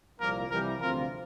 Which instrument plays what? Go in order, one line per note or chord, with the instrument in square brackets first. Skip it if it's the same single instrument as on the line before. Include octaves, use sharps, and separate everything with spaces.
[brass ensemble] C2 A#2 F3 A#3 [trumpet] A#4
[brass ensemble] C2 C3 E3 G3 [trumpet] A#4
[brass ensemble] D2 C3 F3 C4 F4 [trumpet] A#4